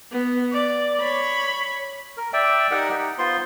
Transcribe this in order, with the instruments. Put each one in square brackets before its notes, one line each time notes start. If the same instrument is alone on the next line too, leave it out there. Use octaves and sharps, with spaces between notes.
[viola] B3
D5
C#5 B5
[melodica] A#4
D5 E5 G5
D#4 G4 A#4 F#5
D#4
B3 F4 C5 C6